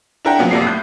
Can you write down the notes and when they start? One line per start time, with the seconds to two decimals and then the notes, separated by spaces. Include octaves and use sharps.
0.25 D4 E4 A#4 F#5 G5
0.38 F3 F#3 A#3 B3 C#4
0.51 F2 C3 A#3 D5 C7
0.65 A2 G6